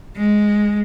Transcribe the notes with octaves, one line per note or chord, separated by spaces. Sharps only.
G#3